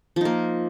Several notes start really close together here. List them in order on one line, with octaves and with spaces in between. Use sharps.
F3 D#4 A#3